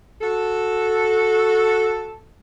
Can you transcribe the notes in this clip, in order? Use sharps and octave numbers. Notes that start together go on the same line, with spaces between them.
F#4 A4